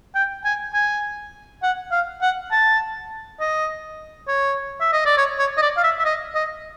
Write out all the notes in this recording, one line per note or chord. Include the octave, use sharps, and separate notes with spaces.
G5
G#5
G#5
F#5
F5
F#5
A5
D#5
C#5
E5
D#5
D5
C#5
C#5
D#5
D5
F5
E5
E5
D#5
D#5